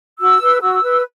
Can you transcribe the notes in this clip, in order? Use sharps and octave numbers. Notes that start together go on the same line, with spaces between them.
F#4 E6
B4
F#4 E6
B4